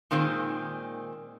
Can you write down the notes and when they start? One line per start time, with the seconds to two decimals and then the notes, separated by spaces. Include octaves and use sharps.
0.11 A#2 D#3 G#3 C4